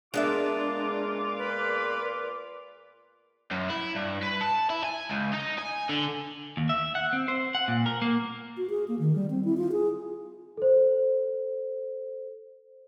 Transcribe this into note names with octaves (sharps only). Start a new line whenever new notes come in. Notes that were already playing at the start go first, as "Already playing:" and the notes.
A#2 G#3 B3 D4 F4 E5 D6
B4
F#2
E4
G2
B4
A5
E4
G#5
C#2
D#4
G#5
D3
D#2
E5
F#5
C4
C5
F#5
A#2
A#4
A#3
F#4
G#4
A#3
D#3
G3
C4
E4
F4
G#4
A4 C5